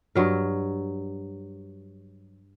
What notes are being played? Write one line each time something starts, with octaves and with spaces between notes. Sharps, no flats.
G2 F#3 A#4